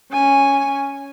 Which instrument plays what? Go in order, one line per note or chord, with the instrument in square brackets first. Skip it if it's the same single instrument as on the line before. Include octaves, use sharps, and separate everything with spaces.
[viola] C#4 G#5